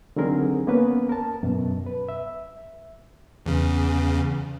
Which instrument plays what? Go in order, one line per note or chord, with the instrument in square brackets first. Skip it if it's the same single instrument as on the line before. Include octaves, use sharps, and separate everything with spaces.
[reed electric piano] D3 D#3 F#3 C4 G#4 A#4
A#3 B3 C#4 B4
A#4 A5
F#2 B2
B4
E5
[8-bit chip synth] E2 C#3